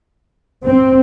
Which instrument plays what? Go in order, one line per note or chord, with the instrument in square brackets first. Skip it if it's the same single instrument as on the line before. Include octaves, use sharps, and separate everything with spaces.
[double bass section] C4